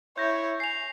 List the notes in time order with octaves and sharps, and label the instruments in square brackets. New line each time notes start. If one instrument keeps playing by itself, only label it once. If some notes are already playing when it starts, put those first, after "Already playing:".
[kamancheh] E4 C#5 [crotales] G6 A#6
[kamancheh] G#5 [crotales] C7 F7